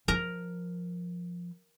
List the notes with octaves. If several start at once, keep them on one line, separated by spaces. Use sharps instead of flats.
F3 A#4 A#5